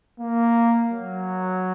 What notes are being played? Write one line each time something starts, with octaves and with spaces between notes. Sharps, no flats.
A#3
F#3